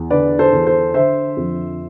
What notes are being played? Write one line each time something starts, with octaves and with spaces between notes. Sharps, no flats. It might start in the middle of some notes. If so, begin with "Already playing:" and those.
Already playing: E2
D3 B4 D5
A4 C5
E2
A4 C5
D3 C5 E5
F2